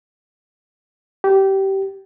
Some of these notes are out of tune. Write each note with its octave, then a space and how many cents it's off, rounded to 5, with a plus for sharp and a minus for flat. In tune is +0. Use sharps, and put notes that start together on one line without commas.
G4 -20